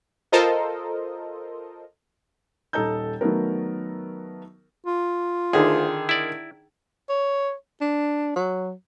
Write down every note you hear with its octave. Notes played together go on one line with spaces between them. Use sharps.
F4 A4 A#4 C5 D#5
D#1 D#4 A4 D#5 A#5 G6
D#3 F#3 A3 B3 A#4
F4
D2 D3 D#3 G#4
E4 D5
C#5
D4
F#3